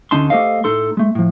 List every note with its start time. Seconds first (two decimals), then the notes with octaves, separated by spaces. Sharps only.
0.11 D2 D3 C#4 D#4 A5 C6
0.30 A3 G4 A4 C5 D#5 F5
0.64 A2 D#4 A4 C6
0.97 G#3 A3
1.15 A2 F3